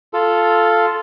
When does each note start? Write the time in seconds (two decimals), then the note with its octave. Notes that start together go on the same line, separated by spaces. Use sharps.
0.13 F4 A4